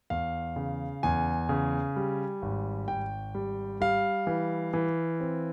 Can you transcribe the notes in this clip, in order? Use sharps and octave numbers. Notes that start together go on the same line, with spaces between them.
E2 F5
C#3
E2 G#5
C#3
G3
G#1
G#1 G5
G3
G3 F5
E3
E3
C4